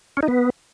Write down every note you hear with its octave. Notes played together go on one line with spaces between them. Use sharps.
C#4
D#4
B3